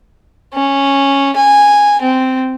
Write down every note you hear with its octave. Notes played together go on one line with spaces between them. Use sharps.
C#4
G#5
C4